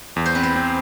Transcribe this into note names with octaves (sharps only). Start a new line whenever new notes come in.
E2
C5
C4 B4
C5
C4